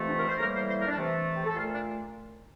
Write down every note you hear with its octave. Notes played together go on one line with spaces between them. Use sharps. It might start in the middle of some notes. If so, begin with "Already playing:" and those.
Already playing: F2 C3 E3 A3
D4
A#4
C5
A2 E3 G3 A#3 A#4
C5
C5
A#4
D4
C3 E3 A3
G4
A4
A#2 A3 F4
D4